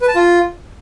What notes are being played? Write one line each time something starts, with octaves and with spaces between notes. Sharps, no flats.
B4
A5
F4